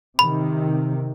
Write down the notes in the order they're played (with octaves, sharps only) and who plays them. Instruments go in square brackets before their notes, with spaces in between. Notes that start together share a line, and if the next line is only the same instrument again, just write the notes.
[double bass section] C3 D#3 [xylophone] B5